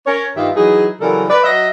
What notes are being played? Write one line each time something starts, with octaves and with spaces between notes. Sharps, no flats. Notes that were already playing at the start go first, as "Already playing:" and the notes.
C#4 A#4 C#5
G2 D#3 D#4 F4 G4 E5
E3 F#3 D#4 G#4
C#3 E3 F#3 G3 A4 A#4
B4 D5
F#3 D#5 E5